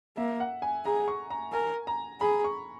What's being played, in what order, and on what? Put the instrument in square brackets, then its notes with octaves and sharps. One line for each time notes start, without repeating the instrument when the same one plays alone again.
[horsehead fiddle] A#3 [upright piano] E5
[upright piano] F#5
G#5
[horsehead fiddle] G#4 [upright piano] A#5
[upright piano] C#6
A#5
[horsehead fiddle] A#4 [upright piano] G#5
[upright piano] A#5
[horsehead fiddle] G#4 [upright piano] B5
[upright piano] C#6